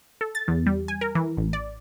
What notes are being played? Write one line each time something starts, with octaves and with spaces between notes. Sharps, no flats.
A4
A6
E2
G3
G#5
A#4
E3
A1
D5